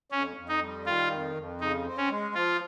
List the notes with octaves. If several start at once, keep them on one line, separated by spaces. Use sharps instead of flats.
F2 C#4
F2
D#4
G3
D#3 F4
F2
F2
C#3 D#4
C4
C#4
G#3
F3 F4